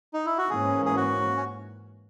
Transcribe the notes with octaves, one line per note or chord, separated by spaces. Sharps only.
D#4
E4
F#4
G#2 E3 A#3 C#4 G#4
G#4
F#4
C#4